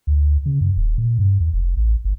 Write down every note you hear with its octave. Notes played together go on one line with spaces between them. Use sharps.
D2
C#3
F#2
D#1
A#2
G2
E2
F1
A1
G1